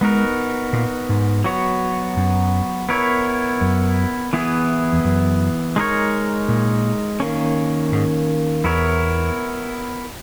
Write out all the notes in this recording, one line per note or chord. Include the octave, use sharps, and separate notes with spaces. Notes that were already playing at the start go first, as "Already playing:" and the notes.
G#3 B3 D#4 F#4 A#4
A#2
G#2
F#3 B3 F#4 C#5
F#2
B3 E4 A#4 C#5
F#2
E3 B3 E4 G#4
E2
F#2
G#3 D#4 A#4 C#5
A#2
D#3 A#3 C#4
G#2
E2 B3 E4 A#4 C#5